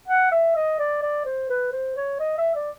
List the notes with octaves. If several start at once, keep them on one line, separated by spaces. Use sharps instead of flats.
F#5
E5
D#5
D5
D5
C5
B4
C5
C#5
D#5
E5
D5